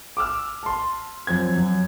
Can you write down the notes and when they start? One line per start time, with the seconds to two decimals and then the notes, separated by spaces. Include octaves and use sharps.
0.17 D6 E6 F6
0.63 A5 C6
1.27 F#2 F3 C4 G#6
1.56 F#2